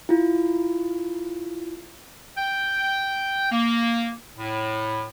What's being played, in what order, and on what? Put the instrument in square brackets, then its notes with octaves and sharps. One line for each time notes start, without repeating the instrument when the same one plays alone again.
[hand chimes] E4 F4
[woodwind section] G5
A#3
A2